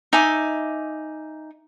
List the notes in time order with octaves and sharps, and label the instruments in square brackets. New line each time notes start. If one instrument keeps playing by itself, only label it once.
[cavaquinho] D#4 E5 G#5 D6